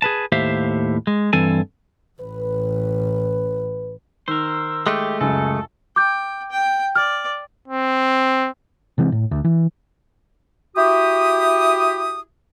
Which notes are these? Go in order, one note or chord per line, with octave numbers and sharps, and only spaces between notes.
G#4 B4 A5
D#2 A2 G4 C5 E5 F5
G#3
G2 E3 C4 A4 G#5
A1 B4
D#3 A#4 C5 E6
G#3 A3 G4
C#2 F#2 A4 G#5
G5 D6 G6
G5
D5 F6
C4
C3 E3 G#3 C4
A2
D2
E3
E4 F#4 G4 D#6